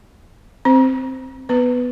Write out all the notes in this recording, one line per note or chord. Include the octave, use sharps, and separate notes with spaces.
C4 C5
B3 B4